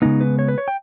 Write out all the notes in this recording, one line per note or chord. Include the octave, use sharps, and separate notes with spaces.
C#3 G#3 B3 D#4
B4
C#5
B4
C#5
G5